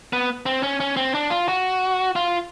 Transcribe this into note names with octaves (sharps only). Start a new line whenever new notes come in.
B3
C4
C#4
C#4
C4
D4
F4
F#4
F4